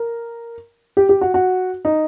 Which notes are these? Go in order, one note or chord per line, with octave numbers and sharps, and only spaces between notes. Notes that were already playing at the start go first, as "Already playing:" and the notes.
Already playing: A#4
G4
G4
F#4
F#4
D#4